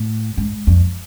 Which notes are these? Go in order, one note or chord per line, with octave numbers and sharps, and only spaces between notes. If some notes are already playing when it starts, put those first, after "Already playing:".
Already playing: A2
G#2
F2